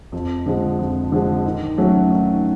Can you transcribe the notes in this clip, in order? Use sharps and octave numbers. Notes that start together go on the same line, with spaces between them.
F2
D3 F3 G#3
F2
D3 F3 G#3
D#3
F#3 A3 C#4
D#3